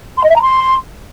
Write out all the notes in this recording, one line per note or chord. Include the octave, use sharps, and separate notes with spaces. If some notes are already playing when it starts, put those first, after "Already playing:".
C6
D#5
E5
A#5
C6